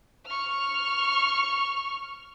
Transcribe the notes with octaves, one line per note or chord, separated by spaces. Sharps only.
C#6 F6